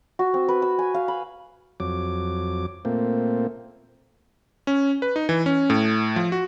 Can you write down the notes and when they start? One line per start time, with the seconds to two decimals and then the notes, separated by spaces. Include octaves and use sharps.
0.19 F#4
0.34 C4
0.48 B4
0.62 E6
0.79 G#5
0.94 F5
1.08 B5
1.80 F2 F#3 D6
2.85 A#2 A3 A#3 C4
4.67 C#4
5.02 B4
5.16 D#4
5.29 E3
5.46 C#4
5.70 A2
6.16 F3
6.32 F#4